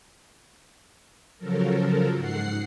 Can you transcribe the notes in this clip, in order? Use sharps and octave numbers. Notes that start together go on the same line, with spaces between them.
C#3 F3 F#3 A4 A#4
G#2 F#5 C7